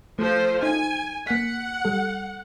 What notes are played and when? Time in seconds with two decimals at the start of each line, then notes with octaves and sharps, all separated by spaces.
0.19 F3 A3 A4 C5
0.63 D#4 G#5
1.27 A#3 F#5 B6
1.85 G3 A4